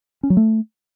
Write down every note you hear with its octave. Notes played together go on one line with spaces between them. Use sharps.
C#4
F#3
A3